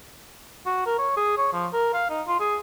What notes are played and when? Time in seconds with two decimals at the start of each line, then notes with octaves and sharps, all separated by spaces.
0.66 F#4
0.86 A#4
0.99 C#5
1.17 G#4
1.38 C#5
1.53 F3
1.73 A#4
1.93 F5
2.10 D#4
2.27 F4
2.40 G#4